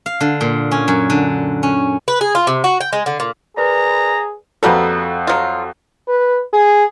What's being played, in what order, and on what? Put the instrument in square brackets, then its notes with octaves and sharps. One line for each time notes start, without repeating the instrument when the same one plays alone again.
[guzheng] F5
D3
A#2
C#4
F#2
D3
C#4
[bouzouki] B4
G#4
F4
C3
F#4
G5
G#3
D3
A#2
[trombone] G#4 [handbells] A#4 B4 D5 [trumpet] A#5
[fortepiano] F2 F#4 A4 [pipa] G3 A#3 B3
[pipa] F#3 F4
[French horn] B4
G#4